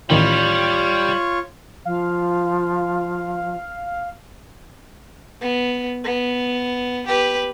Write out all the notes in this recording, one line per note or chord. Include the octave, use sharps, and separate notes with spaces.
A1 D#3 G3 F4 C#5 G5
F3 F5
B3
B3
G4 B4